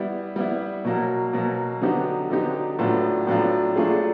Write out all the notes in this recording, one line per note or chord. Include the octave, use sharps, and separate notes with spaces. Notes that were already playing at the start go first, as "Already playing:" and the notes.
Already playing: G3 B3 E4
G3 B3 E4
B2 F#3 A#3
B2 F#3 A#3
D3 F#3 B3 D#4 G4
D3 F#3 B3 D#4 G4
A2 F#3 B3 D4 F4
A2 F#3 B3 D4 F4
F#3 A3 D4 F4 G#4